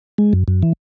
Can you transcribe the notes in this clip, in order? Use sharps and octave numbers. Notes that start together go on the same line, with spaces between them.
G#3
F#2
F#2
E3